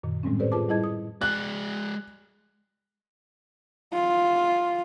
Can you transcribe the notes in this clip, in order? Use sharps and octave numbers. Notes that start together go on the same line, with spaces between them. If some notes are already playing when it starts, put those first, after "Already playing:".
F#2 A#2 D#3
A2 G3 G#3 C4 C#4
G4 A4 B4 C5 D5
F4 G#4 B4 A5 D6
G3 E4 G#4 D#5 A5 G#6
D#6
G#3 D5 F#6
F4